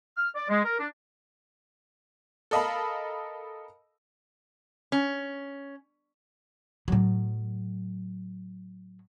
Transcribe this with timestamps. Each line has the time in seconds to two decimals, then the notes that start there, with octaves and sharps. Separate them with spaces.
0.17 F6
0.36 D5
0.49 G#3
0.65 A#4
0.80 D4
2.51 A4 A#4 D#5 F5 A5 B5
4.92 C#4
6.88 A2 F#3